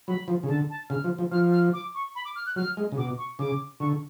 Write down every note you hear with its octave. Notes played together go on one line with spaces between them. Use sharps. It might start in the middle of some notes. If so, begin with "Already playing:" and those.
F#3 B5
F3
C#3
D3 A5
A5
C#3 F6
F3
F3
F3 F6
F6
D6
C#6
B5
D6
F6
F#6
F#3 F6
G#3
C#3
B2 D6
C#6
C#3 D6
D3 C#6